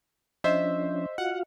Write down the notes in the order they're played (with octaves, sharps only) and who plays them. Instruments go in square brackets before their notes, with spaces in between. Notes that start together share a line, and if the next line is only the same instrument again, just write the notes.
[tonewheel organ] F3 C#4 D4 [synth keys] C5 E5 [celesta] D#5
[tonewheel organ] F4 F#4 F5 [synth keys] F#5